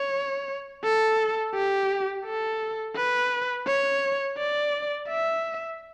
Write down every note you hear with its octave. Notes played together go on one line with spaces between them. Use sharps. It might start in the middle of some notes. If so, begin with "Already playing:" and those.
Already playing: C#5
A4
G4
A4
B4
C#5
D5
E5